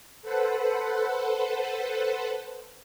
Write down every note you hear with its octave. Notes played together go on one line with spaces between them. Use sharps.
A4 B4 C5 F#5